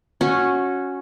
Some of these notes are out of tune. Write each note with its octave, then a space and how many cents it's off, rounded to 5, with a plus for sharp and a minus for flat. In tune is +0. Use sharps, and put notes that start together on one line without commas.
C#4 +0 F#4 -15